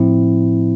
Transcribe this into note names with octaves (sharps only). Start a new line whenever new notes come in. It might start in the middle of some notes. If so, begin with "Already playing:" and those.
Already playing: A2 F3 C4 E4